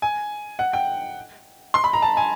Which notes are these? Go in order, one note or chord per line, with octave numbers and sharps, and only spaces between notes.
G#5
F#5
G5
C6
B5
A#5
A5
G#5